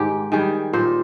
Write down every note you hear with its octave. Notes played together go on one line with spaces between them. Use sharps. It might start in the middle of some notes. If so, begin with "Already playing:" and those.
Already playing: G#2 D#3 G4
D#3 G3 G#4
A#2 C5